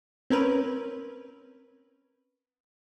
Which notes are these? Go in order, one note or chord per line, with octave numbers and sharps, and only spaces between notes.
C4 C#4 A#4 B4